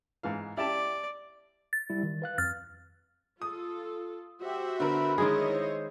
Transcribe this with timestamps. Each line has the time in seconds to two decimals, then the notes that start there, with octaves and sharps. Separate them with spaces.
0.23 G#2 E3 F5
0.57 E4 G4 D5 A5
1.73 A6
1.90 G3 E4
2.03 D#3
2.22 B4 F5 F#6
2.38 F2 F6 A6
3.42 F4 A4 D#6
4.42 F#4 G4 C5 E5
4.80 D3 B3 A#4 B5
5.18 D#3 G#3 E4 G#4 C#5 D#5
5.51 C5